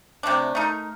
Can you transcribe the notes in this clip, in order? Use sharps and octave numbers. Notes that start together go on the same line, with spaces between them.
C3 F3 A3 D4
A3 D#4 A#4